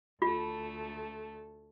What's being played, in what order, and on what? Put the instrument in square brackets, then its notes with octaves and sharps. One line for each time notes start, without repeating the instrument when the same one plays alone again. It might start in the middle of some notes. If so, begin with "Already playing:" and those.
[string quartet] D2 A3 A4 [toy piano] F4